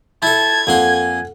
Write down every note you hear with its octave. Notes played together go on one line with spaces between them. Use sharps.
E4 A4 A5 G#6
F2 A#3 A4 F#5 G#5 C6